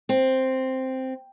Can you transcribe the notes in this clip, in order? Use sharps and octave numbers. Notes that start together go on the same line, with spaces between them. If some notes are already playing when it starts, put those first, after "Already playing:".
C4